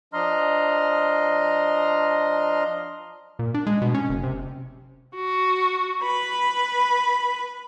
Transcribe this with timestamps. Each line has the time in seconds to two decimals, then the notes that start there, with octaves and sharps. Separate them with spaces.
0.14 F3 D4 D#5 A#5 C6 F6
3.39 A#2
3.54 D4
3.67 G#3
3.82 B2
3.94 C#4
4.09 F#1
4.23 C3
5.16 F#4
6.04 B4 B5